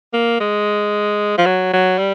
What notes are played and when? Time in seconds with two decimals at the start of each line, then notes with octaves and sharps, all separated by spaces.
0.14 A#3
0.40 G#3
1.38 F3
1.46 F#3
1.73 F#3
1.98 G3